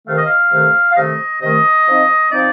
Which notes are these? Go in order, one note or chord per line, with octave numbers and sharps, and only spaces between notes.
C3 D#3 A3 F5
D#5
F5
C3 D#3 A3
F5
C3 D#3 A3 D#5
C3 D#3 A3 D#5
F3 C4 D#4
F3 C4 D#4 D5